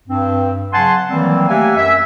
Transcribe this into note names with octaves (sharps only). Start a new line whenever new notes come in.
G2 C4
C#3 F#3 F#5 G#5 A5 C6
D#3 E3 F#3 G3 A#3 C4
A3 A#3 G4 E5 F#5 G#5
F#2 E5